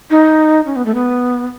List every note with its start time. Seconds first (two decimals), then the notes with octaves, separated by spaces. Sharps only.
0.10 D#4
0.66 C#4
0.76 B3
0.86 A3
0.95 B3